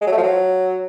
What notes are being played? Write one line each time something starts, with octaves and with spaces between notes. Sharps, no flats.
G#3
F#3
A3
F3
F#3